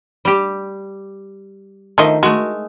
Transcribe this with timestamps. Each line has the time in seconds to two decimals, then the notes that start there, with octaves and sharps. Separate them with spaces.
0.25 G3 G4
1.98 D#3 F3 A3 D#5
2.23 G#3 A3 F#4